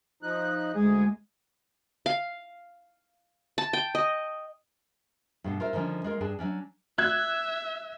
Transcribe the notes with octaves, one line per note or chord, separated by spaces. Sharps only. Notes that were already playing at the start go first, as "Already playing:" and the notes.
F3 D#4 F#6
D2 G#3 G#4
F5
A5
G5
D#5
G2 B2 A4
F4 A#4 C5 E5
D3 D#3 F3 C4 C#4
G#3 F4 A#4
G2 D4 G#4 G5 A5
F#3 A#3 C#4 D4
E5 F#6 G#6